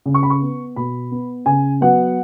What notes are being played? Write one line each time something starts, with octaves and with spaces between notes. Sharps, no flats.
C#3
C#6
B5
C#6
B3
B2 B5
B3
C#3 G#5
F#3 B3 F#5